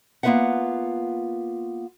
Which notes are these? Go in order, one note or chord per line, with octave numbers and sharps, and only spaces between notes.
A#3 B3 F4 B4 E5 F#5